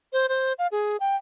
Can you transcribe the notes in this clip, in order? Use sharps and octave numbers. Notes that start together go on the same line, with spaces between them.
C5
C5
F5
G#4
G5